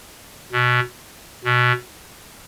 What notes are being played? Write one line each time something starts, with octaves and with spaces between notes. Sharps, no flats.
B2
B2